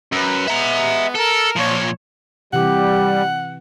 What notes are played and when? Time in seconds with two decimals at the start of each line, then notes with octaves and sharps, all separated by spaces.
0.12 F#2 B4
0.48 G#3 B3 E5 A#5
1.15 A4 A#4
1.56 A#2 F3 C#5
2.53 C3 E3 G3 G4 F#5